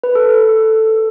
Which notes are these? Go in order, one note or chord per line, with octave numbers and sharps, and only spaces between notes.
B4
A4